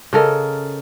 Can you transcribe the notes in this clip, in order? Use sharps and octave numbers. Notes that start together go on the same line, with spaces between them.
C#3 A4 A#4 D#5